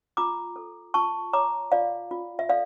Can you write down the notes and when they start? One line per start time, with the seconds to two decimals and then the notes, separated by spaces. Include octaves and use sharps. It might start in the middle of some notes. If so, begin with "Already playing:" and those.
0.17 F4 A#5 D6
0.56 A4
0.94 F4 A5 C#6
1.33 C#5 A#5 D6
1.72 F4 D5 F5
2.11 F4
2.39 E5
2.49 A4 D5 F5